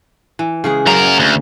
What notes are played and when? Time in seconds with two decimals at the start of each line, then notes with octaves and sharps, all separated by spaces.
0.39 E3
0.64 C#3 G#3 G#4
0.87 F#2 A#3 A#4
1.19 D2